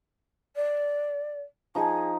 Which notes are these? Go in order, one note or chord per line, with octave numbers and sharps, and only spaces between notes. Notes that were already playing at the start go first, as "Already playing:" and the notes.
D5
F3 D#4 G#4